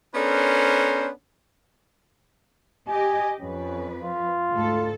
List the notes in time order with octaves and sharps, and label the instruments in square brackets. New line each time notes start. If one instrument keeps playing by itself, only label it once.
[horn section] B3 C#4 D4 A4 A#4 C5
[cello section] G4 D#5 [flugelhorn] G#5
[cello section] F2 B4 [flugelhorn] C#4
[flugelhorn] F4
[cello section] D2 G#2 A4